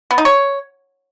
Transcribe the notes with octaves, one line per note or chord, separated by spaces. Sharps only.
B3
D#4
C#5